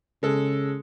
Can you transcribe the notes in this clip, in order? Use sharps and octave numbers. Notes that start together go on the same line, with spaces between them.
C#3 G#3 A4